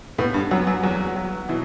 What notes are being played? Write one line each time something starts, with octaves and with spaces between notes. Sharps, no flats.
A2 B3
G2
F#2 F#3
F#2
E2 F#3
F#3
B2 E3